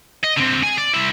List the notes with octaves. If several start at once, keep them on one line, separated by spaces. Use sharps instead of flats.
D#5
D3 C4
G#4 G#5
D5
C2 E4